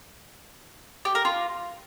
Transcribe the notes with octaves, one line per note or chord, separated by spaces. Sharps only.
G4
A#4
F4